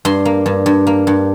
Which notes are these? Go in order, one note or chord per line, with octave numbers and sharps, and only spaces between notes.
G2 C6
A#3
G2
G2
A#3
G2